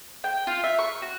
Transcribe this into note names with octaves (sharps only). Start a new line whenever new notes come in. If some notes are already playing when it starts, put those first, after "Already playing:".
G5
F4
E5
C#6
F#4